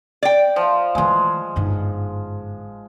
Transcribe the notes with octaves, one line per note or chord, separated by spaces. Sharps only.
D5 G5
F3
E3 G#3 A3
G1 G#2